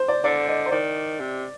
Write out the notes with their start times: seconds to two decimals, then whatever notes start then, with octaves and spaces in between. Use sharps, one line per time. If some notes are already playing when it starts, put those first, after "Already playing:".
Already playing: C5
0.08 D5
0.24 D3 D5
0.48 D#5
0.66 C5
0.71 D#3 D5
1.20 C3